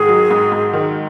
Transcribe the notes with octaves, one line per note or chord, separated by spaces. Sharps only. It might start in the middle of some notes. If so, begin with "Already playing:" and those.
Already playing: G#2 D#3 G#4
F#3
G#2
G#2
D#3